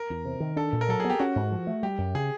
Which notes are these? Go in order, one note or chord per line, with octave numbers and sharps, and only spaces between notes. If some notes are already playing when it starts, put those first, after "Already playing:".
Already playing: A#4
E2
C3
D#3
D4 A4
A#2
A#4
F#3 A4
B3 G#4
G4
C#4 F#4
G#2
F3
A3
G3 G4
F#2
C#3 G#4